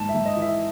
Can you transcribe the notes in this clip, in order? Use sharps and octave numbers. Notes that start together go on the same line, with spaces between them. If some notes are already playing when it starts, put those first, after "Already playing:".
Already playing: G#2 A5
E5
G#2
D#5
E3
E5